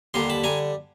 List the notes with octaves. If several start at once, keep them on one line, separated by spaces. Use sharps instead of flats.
D#2 D3 G3 A#5 C6
A5 B5
D3 G3 G#5 A#5